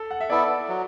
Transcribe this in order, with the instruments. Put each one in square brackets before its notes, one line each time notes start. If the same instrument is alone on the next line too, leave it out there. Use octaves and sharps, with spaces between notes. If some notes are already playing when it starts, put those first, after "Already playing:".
Already playing: [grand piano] A4
F#5
E5
[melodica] B3 E4 A4 [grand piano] D5
[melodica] F#3